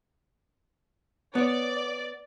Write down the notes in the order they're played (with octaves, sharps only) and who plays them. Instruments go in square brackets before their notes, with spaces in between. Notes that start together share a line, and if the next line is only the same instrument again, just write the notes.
[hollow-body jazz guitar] B3 C#5 [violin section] D5